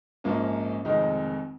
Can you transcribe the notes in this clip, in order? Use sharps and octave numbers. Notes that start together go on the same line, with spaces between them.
A#1 G#2 F3 A#3 C#4
F1 F2 D#3 G#3 D#4